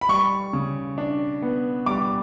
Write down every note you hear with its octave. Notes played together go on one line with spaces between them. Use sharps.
B5
G3 C#6
C#3
D4
B3
G3 D6